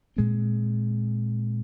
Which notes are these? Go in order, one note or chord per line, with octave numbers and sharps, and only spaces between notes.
A#2 G#3 C4